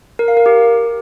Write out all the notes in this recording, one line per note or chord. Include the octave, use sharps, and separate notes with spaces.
A#4
F5
A#4
G4